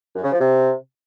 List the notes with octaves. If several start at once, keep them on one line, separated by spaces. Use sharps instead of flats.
F#2
C#3
F3
C3